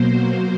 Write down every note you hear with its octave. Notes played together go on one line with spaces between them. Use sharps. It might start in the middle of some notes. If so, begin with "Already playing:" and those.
Already playing: B2 F#3 A#3 C5